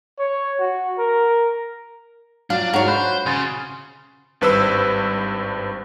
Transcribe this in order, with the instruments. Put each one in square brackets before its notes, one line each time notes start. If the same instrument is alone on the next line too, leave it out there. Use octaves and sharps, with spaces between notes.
[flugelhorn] C#5
F#4
A#4
[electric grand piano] F#3 [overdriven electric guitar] D4 [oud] F4
[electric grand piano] G#2 D4 [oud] F#4 C#5 [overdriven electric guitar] A#4
[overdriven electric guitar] C5 [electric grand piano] B5 F#6
[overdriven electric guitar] C#3 [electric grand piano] G#5 C6 A6
[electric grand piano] G#1 G2 B4 C5 E6